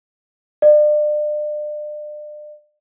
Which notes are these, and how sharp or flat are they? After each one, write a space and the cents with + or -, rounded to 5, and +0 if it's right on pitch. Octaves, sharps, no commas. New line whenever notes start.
D5 +35